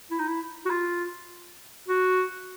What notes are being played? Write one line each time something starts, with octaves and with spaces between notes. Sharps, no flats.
E4
D#4
E4
F#4
F4
F#4